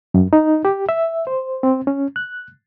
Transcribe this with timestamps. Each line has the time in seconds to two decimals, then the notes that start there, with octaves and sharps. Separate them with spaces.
0.14 F#2
0.33 D#4
0.65 G4
0.89 E5
1.27 C5
1.63 C4
1.87 C#4
2.16 F#6